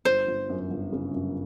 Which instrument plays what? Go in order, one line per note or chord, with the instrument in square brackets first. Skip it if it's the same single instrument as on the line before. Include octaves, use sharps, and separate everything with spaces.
[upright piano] G1 [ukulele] C5
[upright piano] G1
F#2
G1
C#3
F#2